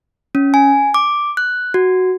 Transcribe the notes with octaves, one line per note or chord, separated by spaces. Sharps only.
C#4
G#5
D6
F#6
F#4